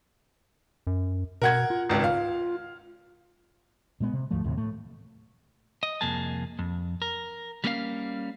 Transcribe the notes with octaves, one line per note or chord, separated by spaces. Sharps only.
F#2
B2 A#4 F#5 G#6
F4
G#1 C#2
F5
A#2 G#3 B3
C3
D2 G#2 F3 A3
D#2 A2 C3
A2 A3
D#5
C2 F2 A#3 G#4 A5
F2
A#4
G3 A#3 C#4 A#4 C5 F5